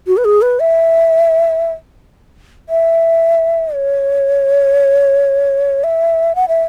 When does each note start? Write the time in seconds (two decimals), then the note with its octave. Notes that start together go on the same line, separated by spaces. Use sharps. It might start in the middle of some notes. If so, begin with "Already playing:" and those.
0.07 F#4
0.17 B4
0.25 G#4
0.42 B4
0.60 E5
2.69 E5
3.74 C#5
5.84 E5
6.35 F#5
6.48 E5